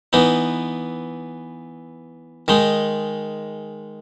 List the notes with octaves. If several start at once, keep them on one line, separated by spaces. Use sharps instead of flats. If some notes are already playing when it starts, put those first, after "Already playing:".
E3 B3 D#4
D#3 G#3 D#4